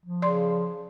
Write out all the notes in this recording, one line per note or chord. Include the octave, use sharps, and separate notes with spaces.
F3
C#3 D5 C6